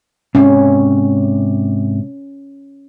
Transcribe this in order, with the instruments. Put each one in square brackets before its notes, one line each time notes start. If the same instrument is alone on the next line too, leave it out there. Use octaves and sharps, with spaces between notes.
[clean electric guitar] G#2 C3 [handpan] C#4